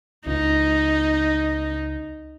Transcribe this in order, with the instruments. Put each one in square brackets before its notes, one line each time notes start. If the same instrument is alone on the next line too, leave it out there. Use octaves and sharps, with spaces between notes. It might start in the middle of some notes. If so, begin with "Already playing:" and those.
[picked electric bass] C#2 [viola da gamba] D#4